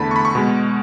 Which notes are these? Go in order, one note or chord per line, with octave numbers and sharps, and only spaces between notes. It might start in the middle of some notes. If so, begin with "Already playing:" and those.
Already playing: E2 D3 A3 A5 B5
C#6
B5
C#6
B2 G#3